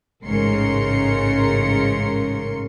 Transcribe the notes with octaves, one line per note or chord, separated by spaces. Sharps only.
A1 G#2 C#3 A#4 C6 C#7